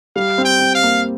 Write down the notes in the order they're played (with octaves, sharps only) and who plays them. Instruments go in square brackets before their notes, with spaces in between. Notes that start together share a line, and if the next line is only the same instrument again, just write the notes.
[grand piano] G3 [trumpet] F5
[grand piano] C4
[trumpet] G5
[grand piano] C4
[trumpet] F5
[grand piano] A#3